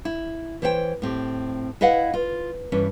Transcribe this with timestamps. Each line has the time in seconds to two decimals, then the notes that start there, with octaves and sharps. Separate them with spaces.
0.05 E4
0.62 E3 C5 C#5 E5 G5
1.02 A2 C4 G4
1.81 E4 B4 D#5 F5 F#5
2.14 F4
2.72 G2 E3 C#4 D4